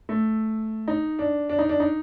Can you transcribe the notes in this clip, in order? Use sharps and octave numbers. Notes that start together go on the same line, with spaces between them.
A3
D#4
D4
D4
D#4
D4
D#4